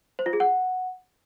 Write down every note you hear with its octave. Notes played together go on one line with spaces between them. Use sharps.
C5
F4
G#4
F#5